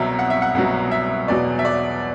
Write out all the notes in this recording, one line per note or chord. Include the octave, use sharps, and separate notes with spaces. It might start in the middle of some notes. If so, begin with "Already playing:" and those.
Already playing: C2 B2 F#3 E5
F#5
E5
F#5
C2 B2 F#3 F#5
E5
E2 B2 F#3 D5
E5
D5